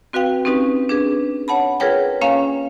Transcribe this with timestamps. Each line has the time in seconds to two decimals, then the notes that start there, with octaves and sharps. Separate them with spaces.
0.13 C4 F#4 B4 F5 G5
0.45 C4 C#4 D#4 G4 B4
0.89 D4 G#4 B4
1.48 C#5 F#5 A5 B5
1.80 F4 G#4 A#4 B4 C#5 G5
2.21 A#3 C#4 C#5 F5 G5 G#5